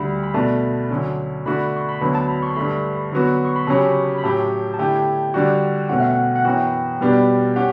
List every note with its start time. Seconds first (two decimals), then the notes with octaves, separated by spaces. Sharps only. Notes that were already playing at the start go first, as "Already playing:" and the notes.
Already playing: D2 D3 G3 B5
0.23 B5
0.34 B2 A3 D4 A5
0.90 D2 D3 F#3 C#4
1.45 D3 A3 D4 F#4 B5
1.77 C#6
1.89 B5
2.01 D2 D3 F#3 B3 A5
2.15 A5
2.28 B5
2.42 C#6
2.56 G2 D3 A3 B5
3.12 D3 F#3 B3 F#4
3.45 C#6
3.56 B5
3.67 C#3 F#3 C#4 G4 A5
4.18 B5
4.23 A2 F#3 C#4 G4 A5
4.74 A5
4.79 D3 A3 E4 G4 G5
5.34 D3 G3 D4 F#4
5.89 B2 A3 C#4 F#5
6.00 E5
6.11 F#5
6.36 F#5
6.45 F#2 E3 B3 F#4 G5
7.01 B2 G3 B3 D4 G4
7.56 C#4 G4 F#5